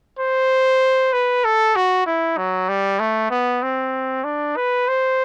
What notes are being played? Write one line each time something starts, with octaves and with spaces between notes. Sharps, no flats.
C5
B4
A4
F#4
E4
F#3
G3
A3
B3
C4
D4
B4
C5